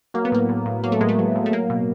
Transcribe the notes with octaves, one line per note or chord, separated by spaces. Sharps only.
F#3 A#3
B3
A2 A#3
A2
A2
F#3 A#3
A3
A2 G#3
A3
F#3
A2
A3
F#3 A#3
B2